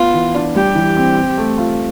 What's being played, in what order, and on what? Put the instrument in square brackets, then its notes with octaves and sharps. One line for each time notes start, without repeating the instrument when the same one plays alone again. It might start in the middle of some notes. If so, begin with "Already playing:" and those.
Already playing: [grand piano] B3 [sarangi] F4
[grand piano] E3
D4
[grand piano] G3 [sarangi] G4
[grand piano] E3
C4
C4
A3
F4